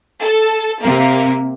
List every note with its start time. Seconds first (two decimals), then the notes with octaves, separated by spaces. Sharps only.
0.22 A4
0.83 C3 A#3